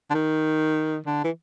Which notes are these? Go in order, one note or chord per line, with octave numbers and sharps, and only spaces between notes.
D3
D#3
D3
E3